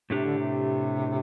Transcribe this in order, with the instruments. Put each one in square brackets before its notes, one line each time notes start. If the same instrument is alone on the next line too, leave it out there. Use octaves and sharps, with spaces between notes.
[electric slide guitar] A2 A3 D4 G4 [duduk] C3
[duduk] D3
C3